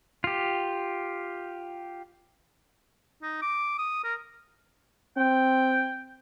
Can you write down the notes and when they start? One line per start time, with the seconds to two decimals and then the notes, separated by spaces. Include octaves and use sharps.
0.24 F4 G4
3.22 D#4
3.42 D6
3.78 D#6
4.04 A#4
5.17 C4 G5